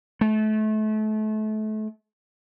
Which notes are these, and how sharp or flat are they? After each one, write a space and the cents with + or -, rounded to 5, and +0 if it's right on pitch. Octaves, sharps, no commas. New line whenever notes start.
A3 -30